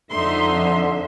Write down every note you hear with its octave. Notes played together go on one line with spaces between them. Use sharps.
F2 D3 D#4 E5 C6